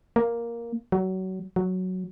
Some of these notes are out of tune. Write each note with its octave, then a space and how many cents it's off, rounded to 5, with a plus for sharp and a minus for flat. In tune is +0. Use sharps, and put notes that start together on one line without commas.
A#3 +5
F#3 +25
F#3 +0